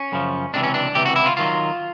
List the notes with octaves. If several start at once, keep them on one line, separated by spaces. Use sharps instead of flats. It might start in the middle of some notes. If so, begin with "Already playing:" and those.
Already playing: C#4
F#2 C#3 F3
C#2 C3 E3 D4
C#4
D4
C#2 C3 E3 G4
F#4
E4
F4
D#3 F#3 F4